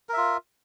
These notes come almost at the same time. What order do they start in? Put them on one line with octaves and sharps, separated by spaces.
A#4 E5 F4